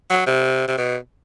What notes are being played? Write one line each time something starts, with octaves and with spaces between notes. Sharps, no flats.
F#3
C3
C3
B2